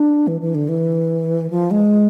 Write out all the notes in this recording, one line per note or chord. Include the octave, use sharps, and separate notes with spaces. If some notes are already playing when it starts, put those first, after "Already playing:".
Already playing: D4
E3
E3
D3
E3
F3
G#3